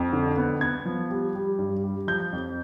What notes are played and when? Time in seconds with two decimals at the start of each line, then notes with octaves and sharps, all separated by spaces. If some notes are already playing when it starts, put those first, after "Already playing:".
Already playing: F2
0.13 D3
0.37 B3
0.61 B3 G#6
0.85 F3
1.10 G3
1.35 G3
1.59 G2
1.83 G3
2.07 F3 G6
2.33 F2